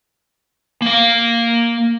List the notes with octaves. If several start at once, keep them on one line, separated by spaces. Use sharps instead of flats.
A#3 F5